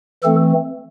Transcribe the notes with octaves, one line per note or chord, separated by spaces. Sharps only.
E3 A3 C4 A4